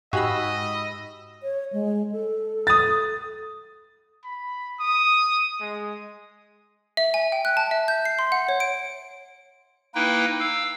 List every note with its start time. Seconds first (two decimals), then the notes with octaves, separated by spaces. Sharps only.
0.13 G#2 F#4 G4 D#5 F5 G#5 B5 E6
1.42 C#5
1.73 G#3
2.12 A4
2.67 D#6 A6
4.25 B5
4.80 D#6
5.61 G#3
6.97 E5
7.14 G#5
7.32 G5
7.45 F#6
7.57 A5
7.71 E5
7.88 G6
8.05 C7
8.19 C6
8.32 F#5
8.49 C#5
8.60 D7
9.95 A#3 D#4 E4 B4 G5
10.40 F5 E6